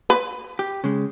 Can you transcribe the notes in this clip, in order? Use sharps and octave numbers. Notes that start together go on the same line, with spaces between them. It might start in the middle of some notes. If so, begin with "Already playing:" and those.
B4
G4
C#3 G#3